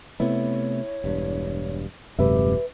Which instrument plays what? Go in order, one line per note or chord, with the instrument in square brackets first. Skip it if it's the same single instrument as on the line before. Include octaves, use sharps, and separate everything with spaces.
[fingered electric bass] C3 A3 B3 [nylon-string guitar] E4 [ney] C#5
[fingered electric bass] E1 G2
[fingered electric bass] D#1 [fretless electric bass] F#2 C3 G#3 [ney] G4 [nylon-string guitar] B4 E5